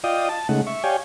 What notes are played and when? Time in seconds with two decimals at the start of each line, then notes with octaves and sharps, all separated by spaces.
0.04 F4 D5 D#5 F5 G5 D#6
0.29 A5
0.49 C#3 G#3 A3 D#4 F#5
0.67 E5 C#6
0.84 G4 C#5 D5 F5 G5 G#5